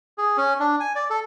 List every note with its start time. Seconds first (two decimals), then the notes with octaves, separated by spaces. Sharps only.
0.18 G#4
0.37 C#4
0.60 D4
0.80 G#5
0.95 D5
1.10 A4